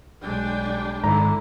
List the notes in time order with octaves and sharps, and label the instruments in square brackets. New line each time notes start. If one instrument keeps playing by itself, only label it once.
[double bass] B1 G#3 [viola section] G3 D4 G5
[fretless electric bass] G#2 D#3 [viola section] D3 E4 [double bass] D4 [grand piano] A#5